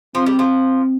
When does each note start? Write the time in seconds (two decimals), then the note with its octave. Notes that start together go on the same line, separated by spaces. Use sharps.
0.15 F3 C4
0.26 G3
0.39 F3